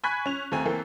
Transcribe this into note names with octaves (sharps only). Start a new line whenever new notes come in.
G#5 B5 C#6 F#6 G#6 B6
C#4 F7
D#2 A3 C4 G#5
E3 A#3 C4 A4